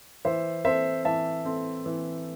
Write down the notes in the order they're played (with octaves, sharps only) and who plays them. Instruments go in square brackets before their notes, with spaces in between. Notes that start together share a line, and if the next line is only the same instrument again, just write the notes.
[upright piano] E3 [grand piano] C5 E5
[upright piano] C4 A4 [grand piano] C5 E5
[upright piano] E3 [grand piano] E5 A5
[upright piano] C4 A4
E3